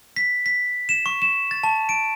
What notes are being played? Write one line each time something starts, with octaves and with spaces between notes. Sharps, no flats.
B6
B6
E7
C#6
E7
A6
A5
D7